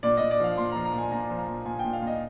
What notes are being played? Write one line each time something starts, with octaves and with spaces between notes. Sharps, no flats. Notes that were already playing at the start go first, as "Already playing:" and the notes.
A#2 D5
A#2 D#5
D5
F3 F5
A#2 C6
F3 A#5
A#5
A#2
G#5
A#2 A#5
F3
A#5
A#2
A#2 G#5
G5
A#2
F5
A#2 D#5